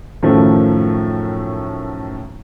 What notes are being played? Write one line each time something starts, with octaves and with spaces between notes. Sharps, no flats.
F#2 A2 D#3 F3 A3